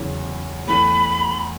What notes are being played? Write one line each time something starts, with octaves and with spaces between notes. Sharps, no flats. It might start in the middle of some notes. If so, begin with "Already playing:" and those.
Already playing: E2 C#3 F#3 C#4 E4
E2 E3 A3 B5